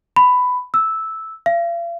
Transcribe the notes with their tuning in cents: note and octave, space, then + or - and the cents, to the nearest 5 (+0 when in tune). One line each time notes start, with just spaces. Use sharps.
B5 +10
E6 -10
F5 -40